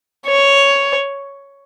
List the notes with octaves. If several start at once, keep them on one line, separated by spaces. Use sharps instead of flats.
C#5